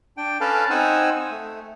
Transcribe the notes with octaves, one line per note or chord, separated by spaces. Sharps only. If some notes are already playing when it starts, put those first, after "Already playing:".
D4 G5
C#4 A4 B4 F5 A5
C4 D#4 C5 F#5 G#5 E6
A3